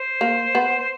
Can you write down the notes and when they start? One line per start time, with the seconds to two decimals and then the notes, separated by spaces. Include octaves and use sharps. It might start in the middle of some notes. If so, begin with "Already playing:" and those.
Already playing: C5
0.21 A#3
0.55 B3
0.79 C5